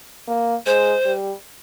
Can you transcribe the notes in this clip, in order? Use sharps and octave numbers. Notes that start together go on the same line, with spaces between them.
A#3
G#3 C5
G3